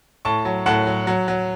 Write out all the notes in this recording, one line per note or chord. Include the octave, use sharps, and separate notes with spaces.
A2 A5 C#6
F#3
A2 F#5 A5
F#3
F#3
F#3